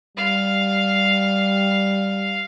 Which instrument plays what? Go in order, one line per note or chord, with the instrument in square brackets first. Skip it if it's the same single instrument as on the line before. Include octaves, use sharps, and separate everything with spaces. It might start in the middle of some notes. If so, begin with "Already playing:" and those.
[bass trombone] G3 [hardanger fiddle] F5